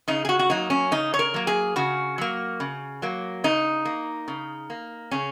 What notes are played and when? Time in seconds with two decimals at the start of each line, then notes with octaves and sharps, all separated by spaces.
0.08 C#3 D#4
0.25 G#4
0.29 F#4
0.39 F#4
0.50 F#3 A#3 D#4
0.70 C#4
0.92 C#3 D#4
1.14 C#5
1.19 A#4
1.34 F#3 A#3
1.47 G#4
1.76 C#3 F#4
2.18 F#3 A#3
2.60 C#3
3.02 F#3 A#3
3.44 C#3 D#4
3.85 A#3
4.28 C#3
4.70 A#3
5.11 C#3 C#4